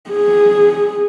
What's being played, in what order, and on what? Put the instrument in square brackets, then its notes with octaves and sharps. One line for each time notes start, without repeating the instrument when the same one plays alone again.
[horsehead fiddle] G#4